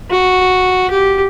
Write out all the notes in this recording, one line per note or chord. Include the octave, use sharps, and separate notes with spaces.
F#4
G4